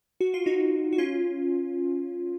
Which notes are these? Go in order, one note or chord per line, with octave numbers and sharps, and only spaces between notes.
F#4
F4
D#4 F#4
F#4
C#4 F4